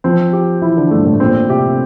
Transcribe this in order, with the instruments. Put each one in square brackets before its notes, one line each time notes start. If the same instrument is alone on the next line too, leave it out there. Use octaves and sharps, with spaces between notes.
[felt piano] F3 [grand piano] C4
[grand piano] G4
[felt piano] E3 [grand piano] E4
[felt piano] D3
[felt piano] G2 [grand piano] A3
[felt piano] A2
[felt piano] A#2 [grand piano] C4
[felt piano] C3 [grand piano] G4